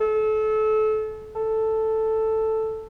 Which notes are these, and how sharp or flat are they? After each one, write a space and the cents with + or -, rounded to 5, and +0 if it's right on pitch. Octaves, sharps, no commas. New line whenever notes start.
A4 -30
A4 +5